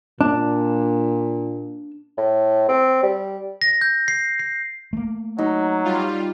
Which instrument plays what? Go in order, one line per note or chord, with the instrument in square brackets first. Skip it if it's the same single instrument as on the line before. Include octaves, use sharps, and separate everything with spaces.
[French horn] A#2 [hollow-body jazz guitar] D4
[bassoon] A2
C4
G3
[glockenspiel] A#6
G6
C7
C7
[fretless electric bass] A3 A#3
[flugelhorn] F#3 [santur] D#4
[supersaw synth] G3 F4